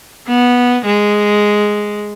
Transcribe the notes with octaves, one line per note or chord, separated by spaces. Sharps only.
B3
G#3